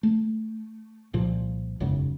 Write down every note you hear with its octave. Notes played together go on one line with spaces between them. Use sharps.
A3
C2 A#2 F3
E1 B1 F#2 C#3